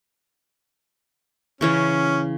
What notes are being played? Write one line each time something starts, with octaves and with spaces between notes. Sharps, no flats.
C#3 E3 C#4 C#5